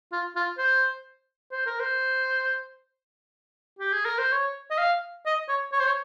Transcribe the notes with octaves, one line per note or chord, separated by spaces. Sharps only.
F4
F4
C5
C5
A#4
C5
G4
G#4
A#4
C5
C#5
D#5
F5
D#5
C#5
C#5
C5
C#5